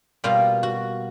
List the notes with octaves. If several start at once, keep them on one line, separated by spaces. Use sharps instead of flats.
B2 G3 A#3 F4
F#4